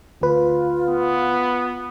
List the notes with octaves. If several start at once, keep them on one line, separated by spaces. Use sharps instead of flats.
D2 F4 B4
B3